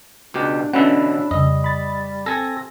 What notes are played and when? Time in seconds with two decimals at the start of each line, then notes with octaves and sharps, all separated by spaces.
0.34 C#2 B2 D4 G4
0.74 B2 D3 E3 C#4 D4 F#5 B5 E6
1.31 F2 C#3 G3 D#5
1.64 B5 A6
2.26 C4 A4 G#5 A#6